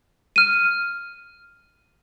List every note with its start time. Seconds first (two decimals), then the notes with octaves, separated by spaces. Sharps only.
0.36 F6 D#7